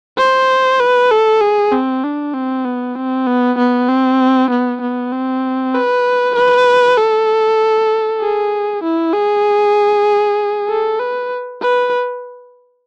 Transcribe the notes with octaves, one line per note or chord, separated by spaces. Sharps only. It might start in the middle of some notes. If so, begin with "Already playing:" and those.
C5
B4
A4
G#4
C4
D4
C4
B3
C4
B3
B3
C4
B3
B3
C4
B4
B4
A4
G#4
E4
G#4
A4
B4
B4